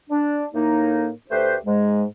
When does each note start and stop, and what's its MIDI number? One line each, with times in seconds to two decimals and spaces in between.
0.09 0.45 62
0.53 1.10 45
0.53 1.10 58
0.53 1.10 63
1.30 1.56 38
1.30 1.56 57
1.30 1.56 67
1.30 1.56 71
1.30 1.56 72
1.66 2.03 44
1.66 2.03 56